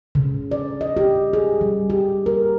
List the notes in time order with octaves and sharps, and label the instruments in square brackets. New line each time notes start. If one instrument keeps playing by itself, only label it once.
[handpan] C#3
D5
D#5
G4
G#4
G3
G4
A#4